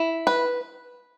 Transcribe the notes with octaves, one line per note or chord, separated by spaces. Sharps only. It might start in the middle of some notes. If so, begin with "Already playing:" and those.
Already playing: E4
B4